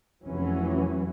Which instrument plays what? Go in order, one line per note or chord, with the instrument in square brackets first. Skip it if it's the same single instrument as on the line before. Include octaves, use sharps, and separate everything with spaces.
[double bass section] F1 E3 F#3 C#4